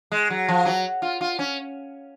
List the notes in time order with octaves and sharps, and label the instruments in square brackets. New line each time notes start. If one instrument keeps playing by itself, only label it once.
[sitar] G#3
F#3
F3
F#3
F4
F4
C#4